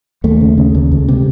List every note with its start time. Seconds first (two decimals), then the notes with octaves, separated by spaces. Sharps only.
0.24 D#2 A3
0.41 C#3
0.58 C#3
0.75 D#2
0.92 C#2
1.08 C3